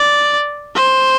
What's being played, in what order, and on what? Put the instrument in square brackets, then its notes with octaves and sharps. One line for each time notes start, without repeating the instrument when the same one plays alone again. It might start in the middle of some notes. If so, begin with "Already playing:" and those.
Already playing: [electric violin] D5
C5